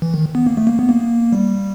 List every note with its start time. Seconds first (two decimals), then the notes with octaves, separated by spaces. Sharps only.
0.02 E3
0.14 D#3
0.35 B3
0.46 A#3
0.57 A3
0.67 A#3
0.79 B3
0.89 A#3
1.32 G3